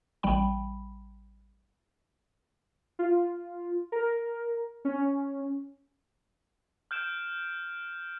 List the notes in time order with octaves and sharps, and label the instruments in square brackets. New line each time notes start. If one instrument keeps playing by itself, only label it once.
[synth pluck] A1 G3 G5 B5
[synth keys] F4
A#4
C#4
[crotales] F6 G6 D7 E7